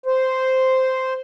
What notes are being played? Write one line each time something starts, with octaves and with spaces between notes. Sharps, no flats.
C5